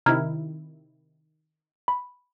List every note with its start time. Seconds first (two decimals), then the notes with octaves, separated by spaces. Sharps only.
0.06 C3 D#3 E4 A#5 F6 G#6
1.88 B5